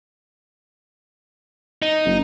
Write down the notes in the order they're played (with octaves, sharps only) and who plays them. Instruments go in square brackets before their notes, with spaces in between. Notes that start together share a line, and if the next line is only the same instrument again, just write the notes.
[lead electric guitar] D#4
[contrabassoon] F#1